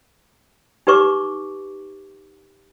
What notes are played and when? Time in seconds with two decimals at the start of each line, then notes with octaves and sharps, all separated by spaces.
0.87 D#4 G4 B4 C#6 D6